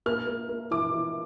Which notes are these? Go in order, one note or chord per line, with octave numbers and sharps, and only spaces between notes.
A#3 F6
A#3
A#3
E3 D6
E3